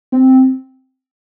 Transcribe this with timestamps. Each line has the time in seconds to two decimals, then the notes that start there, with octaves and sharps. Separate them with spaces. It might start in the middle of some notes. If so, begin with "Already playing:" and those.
0.12 C4